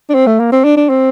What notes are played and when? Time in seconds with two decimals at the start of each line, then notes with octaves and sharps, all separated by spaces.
0.09 D4
0.14 C4
0.26 A3
0.39 A#3
0.52 C4
0.64 D4
0.77 D4
0.89 C4